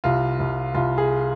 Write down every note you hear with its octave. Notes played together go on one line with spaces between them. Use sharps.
C2 F4
C2
C2 F4
G#4